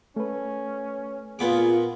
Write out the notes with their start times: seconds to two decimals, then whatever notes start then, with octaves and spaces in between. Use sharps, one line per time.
0.16 A3 C#4 B4
1.39 A#2 B3 F4 G#4 D6